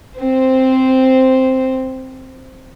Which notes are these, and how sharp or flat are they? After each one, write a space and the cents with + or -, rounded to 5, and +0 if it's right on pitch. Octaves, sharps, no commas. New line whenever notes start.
C4 +0 C5 -5